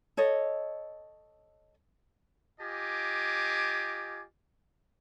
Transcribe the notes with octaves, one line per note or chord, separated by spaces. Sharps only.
A4 C#5 D#5
F4 G4 D#5 G#5 D6